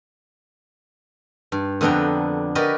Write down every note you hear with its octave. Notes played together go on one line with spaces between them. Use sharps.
G2
F2 D3 B3 D4 G5 A#5
F#4 G4 A#4 B4 D5 D#5